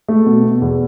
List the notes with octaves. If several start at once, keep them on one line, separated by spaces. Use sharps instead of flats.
A3
B2
B2
E2